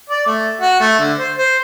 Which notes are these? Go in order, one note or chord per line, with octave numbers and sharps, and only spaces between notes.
D5
A3
F#4
A3
D3
C5
C5